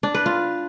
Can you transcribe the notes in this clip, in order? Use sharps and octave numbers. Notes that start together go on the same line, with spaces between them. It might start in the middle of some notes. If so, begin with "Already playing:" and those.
D4
B4
F4